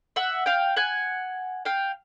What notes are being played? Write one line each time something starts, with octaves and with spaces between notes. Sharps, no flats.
E5 F#5
F5 G5
F#5 G#5
F5 G5